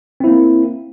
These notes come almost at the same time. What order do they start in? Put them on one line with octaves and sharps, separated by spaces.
C4 E4 A#3